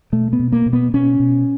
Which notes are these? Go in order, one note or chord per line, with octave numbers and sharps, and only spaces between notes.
B2 A3
B3
B2
A#3
B2
B3
B2 C#4
B2